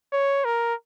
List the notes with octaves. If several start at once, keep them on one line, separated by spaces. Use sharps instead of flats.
C#5
A#4